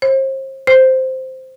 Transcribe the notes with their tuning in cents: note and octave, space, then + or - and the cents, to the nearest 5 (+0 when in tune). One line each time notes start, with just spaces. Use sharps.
C5 +35
C5 -5